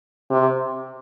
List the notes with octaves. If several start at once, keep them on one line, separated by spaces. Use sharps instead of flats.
C3